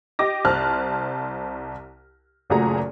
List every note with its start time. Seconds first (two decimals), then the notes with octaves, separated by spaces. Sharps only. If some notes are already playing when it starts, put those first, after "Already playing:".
0.19 G4 D#5 D6 A#6
0.45 C2 C5 A5 F6 F#6
2.50 F#1 A#2 A3 F#4 G#4 A#5